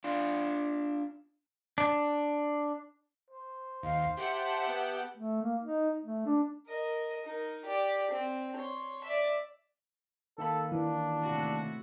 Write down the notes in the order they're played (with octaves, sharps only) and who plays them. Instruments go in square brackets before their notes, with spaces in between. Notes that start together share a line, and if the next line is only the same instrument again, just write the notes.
[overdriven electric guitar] D4 F4
[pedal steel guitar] D4
[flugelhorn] C5
[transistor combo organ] D#2 [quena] F5
[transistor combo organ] G4 [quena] E5 [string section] F#5 A5
[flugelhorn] B3
[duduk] A3
A#3
D#4
A3
D4
[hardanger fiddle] A#4 D#5
D#4 A#4
G4 D5
C4
C#5 C6
D5 E5
[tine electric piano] D#3 A#3 B5 [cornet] A4
[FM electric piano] E3 [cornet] D4
[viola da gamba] A2 C3 F#4